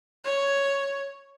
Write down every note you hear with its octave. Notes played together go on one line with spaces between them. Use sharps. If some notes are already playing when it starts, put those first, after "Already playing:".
C#5